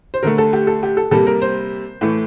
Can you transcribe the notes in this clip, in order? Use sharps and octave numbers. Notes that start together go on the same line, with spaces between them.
C5
D3 A3 A#4
A4
G4
A4
G4
A4
C3 G3 A#3 A4
A#4
C5
A2 E3 A3